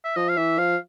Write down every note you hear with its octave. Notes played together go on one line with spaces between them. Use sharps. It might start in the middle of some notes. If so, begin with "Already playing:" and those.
E5
F3 D#5
F5
E3 E5
F3 F5